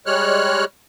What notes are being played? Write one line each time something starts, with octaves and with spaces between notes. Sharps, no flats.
G3 G#3 C#5 F6 F#6